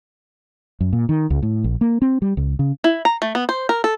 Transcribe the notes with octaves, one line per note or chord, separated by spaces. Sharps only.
F#2
A#2
D#3
C#2
A2
A#1
A#3
C4
G3
C#2
C#3
E4
A#5
A3
B3
C5
A#4
A4